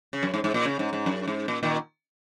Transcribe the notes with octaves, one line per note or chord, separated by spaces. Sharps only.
C#3
F#2
G#2
G#2
A#2
C#3
G#2
G#2
F#2
G#2
A#2
A#2 D#3